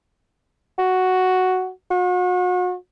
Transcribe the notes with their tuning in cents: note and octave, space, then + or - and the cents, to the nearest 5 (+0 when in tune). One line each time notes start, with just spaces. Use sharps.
F#4 +0
F#4 -40